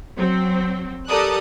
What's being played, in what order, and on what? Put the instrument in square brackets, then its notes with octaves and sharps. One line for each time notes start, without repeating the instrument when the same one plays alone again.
[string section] F#3 C4
G4 A4 A#4 D5 D#6 F#6